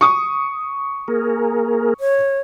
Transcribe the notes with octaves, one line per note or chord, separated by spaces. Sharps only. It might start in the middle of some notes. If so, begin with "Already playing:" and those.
C#6 D#6
A#3 G#4 A#4
C#5